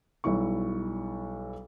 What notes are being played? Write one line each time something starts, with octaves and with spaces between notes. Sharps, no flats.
B1 F#3 G3 E4 C#6